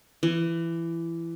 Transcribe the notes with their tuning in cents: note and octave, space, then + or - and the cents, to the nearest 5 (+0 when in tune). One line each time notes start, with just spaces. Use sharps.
E3 +20